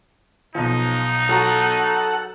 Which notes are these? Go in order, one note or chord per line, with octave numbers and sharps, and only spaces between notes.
B1 F3 D#4
F#3 F#4 A4 F#5 A#5